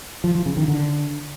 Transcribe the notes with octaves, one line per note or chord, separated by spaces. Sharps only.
F3
F3
C#3
D#3
D3